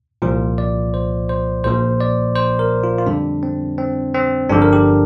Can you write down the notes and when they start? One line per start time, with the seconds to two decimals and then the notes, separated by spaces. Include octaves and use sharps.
0.22 C2 A#2 F3 F4
0.58 D5
0.94 C5
1.29 C5
1.64 A#1 A#2 F3 C5
2.00 D5
2.36 C5
2.59 A#4
2.84 F4
2.98 F4
3.06 F2 D3 G3 D4
3.43 C4
3.78 C4
4.14 C4
4.49 G1 G2 D3 F3 D4
4.62 A#4
4.73 G4